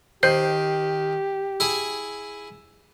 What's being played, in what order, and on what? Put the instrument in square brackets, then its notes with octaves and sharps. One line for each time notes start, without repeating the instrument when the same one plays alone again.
[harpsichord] D#3 [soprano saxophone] G4 [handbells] C5 G6 C7
[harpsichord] E4 G#4 G#5